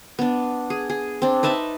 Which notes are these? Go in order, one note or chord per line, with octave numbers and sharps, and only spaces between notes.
B3 D4
G#4
G#4
C4 D4
D#4 B4 E5 A5